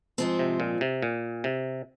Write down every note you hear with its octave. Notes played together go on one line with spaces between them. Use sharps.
G#2 F3 C4
C3
A#2
C3
A#2
C3